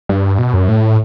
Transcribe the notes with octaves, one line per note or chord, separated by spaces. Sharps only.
G2
B2
F#2
A2